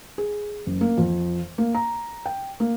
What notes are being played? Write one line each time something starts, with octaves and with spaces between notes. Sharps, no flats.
G#4
F#1
A#3
F2
A#3
A#5
G5
A#3